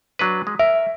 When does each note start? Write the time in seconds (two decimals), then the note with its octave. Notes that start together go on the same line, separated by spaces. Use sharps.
0.19 F#3 D4 B4
0.47 G#3
0.59 A#4 E5